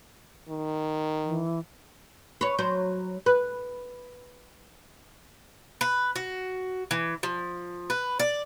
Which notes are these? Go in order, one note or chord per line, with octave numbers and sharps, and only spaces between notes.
D#3
E3
B4 C#5
F#3 C5
B4
B4
F#4
E3
F3
B4
D5